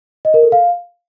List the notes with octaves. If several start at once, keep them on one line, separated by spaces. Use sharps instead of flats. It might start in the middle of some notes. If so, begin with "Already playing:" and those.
D#5
A#4
A4
F5